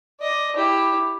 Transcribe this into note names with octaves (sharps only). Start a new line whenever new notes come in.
D5 D#5
E4 G4